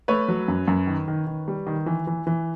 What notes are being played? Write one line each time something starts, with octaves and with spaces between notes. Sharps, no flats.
A3 B4 C#5
F#3
F#2
F#2
D#3
D#3
D#3
G3
D#3
E3
E3
E3